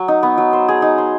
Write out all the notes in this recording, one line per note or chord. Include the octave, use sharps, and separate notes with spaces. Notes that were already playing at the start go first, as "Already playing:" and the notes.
Already playing: F#3
D#4
B3
F#3
C5
G#4
D#4
C5